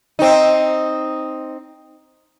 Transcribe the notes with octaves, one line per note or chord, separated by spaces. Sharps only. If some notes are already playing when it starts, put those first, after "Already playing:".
C4 D#4